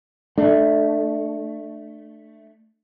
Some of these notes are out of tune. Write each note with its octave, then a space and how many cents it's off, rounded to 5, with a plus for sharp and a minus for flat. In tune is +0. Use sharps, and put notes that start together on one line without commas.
A3 +0 D4 +30